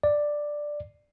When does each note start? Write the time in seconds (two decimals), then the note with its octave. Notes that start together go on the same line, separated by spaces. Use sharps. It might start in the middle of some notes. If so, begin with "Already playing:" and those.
0.03 D5